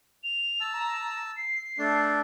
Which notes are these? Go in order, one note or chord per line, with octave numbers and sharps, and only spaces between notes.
F7
A5 E6
A#5
C7
A3 D4